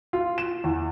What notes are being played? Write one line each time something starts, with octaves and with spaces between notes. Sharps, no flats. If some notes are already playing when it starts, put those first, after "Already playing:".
F4
E7
E2